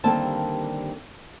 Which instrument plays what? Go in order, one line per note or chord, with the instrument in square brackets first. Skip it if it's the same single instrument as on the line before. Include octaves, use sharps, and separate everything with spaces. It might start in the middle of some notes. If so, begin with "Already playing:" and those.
[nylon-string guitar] D#2 D3 G3 A#3 C4 A5